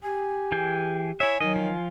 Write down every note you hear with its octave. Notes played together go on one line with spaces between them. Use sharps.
G4 G#5
E3 G#4 G5
E4 C#5 E5 G#5
D#3 F#3 D#5
F3 F4